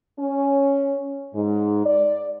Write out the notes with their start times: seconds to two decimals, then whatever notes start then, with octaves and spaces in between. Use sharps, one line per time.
0.19 C#4
1.35 G#2
1.86 D5